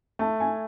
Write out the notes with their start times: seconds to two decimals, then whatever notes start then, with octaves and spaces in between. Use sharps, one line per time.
0.19 A3 A5
0.40 G#5